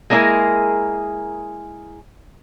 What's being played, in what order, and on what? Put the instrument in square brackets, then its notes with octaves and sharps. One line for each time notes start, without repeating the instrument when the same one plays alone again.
[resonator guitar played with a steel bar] G#3 A#3 D4 E4 G#4 A#4